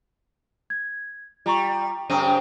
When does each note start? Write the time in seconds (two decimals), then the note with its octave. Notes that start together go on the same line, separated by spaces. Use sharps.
0.70 G#6
1.46 G3 F4 A#5 C#6
2.10 F#2 C#3 C4 A#5 D#6 D#7